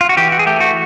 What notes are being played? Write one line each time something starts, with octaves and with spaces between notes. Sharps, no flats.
F4
F#4
E3 G4
F#4
G#4
A3 G4
F#4